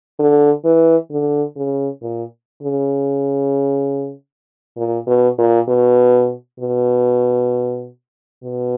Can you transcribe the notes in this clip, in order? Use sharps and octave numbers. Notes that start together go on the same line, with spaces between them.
D3
E3
D3
C#3
A#2
C#3
A#2
B2
A#2
B2
B2
B2